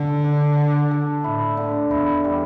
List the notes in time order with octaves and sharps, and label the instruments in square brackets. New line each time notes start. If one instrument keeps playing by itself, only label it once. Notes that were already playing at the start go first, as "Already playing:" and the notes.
Already playing: [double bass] D3 [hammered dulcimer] A4
[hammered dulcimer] D4
D4
A4
[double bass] A2 [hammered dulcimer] E4
[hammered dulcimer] D3
[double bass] E2 [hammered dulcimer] E4
[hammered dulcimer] G3